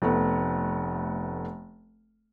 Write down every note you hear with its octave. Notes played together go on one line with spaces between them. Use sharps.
F1 A3 B3